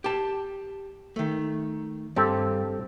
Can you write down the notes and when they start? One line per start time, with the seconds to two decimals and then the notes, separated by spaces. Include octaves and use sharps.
0.04 G4 A5
1.16 D#3 A3
2.16 G2 C4 G4 A4